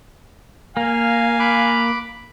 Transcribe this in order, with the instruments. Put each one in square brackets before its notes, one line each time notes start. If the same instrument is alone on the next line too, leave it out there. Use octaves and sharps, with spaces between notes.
[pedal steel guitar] A#3 [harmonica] F5 G#5
[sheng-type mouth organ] B5 D6 F#6